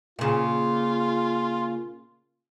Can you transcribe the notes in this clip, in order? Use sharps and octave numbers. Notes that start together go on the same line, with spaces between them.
A#2 C#3 F4